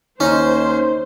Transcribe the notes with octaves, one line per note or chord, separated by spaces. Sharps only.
D#2 C#4 D#4 C5